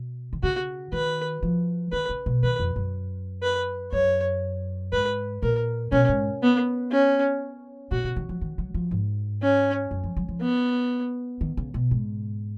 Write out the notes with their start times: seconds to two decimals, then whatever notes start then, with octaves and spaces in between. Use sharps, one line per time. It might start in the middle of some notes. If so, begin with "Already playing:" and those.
Already playing: B2
0.33 D#3
0.43 C#3 F#4
0.92 D#3 B4
1.43 F3
1.92 D#3 B4
2.09 C#3
2.26 B2
2.43 D#3 B4
2.60 F2
2.76 F#2
3.42 B4
3.92 F#2 C#5
4.92 G#2 B4
5.43 A#2 A#4
5.92 B2 C#4
6.09 G#2
6.42 B3
6.91 C#4
7.91 A#2 F#4
8.04 B2
8.16 D#3
8.29 F3
8.41 D#3
8.58 F#3
8.74 F3
8.91 G#2
9.42 C#4
9.91 F#2
10.04 F3
10.17 F#3
10.28 F3
10.41 B3
11.41 D#3
11.57 C#3
11.74 B2
11.91 G#2